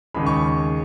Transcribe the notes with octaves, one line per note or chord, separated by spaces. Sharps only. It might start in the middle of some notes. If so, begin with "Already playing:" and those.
D#2 C#3 G#3 B5
C#6